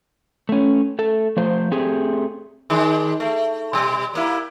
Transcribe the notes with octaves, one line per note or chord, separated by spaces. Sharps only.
A3 C#4
A3 A4
F3 A3 C5
A3 C4 G4 G#4
D#3 G#3 D4
A3
B2 G3
G3 A#3 E4